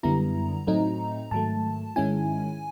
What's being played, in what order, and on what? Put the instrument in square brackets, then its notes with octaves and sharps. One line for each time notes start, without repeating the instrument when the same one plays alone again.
[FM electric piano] F#2 D3 G3 B3 E4 A#5
A2 F#3 A3 C4 D#4
G#2 D#3 F#3 A3 A5
G#2 D#3 G#3 C#4 E4 G#5